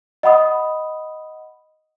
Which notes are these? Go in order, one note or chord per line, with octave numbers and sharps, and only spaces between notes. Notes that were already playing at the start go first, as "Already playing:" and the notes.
D#5 F#5 B5 D#6